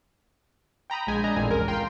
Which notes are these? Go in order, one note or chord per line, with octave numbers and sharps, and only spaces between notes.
G5 A#5 B5 D#6
A#1 G#3 G#5 B5 G6
D4 D#5 A#5
A1 F2 A#2 C4 G#4 G#5
C#2 A#4
F4 G5 A#5 C6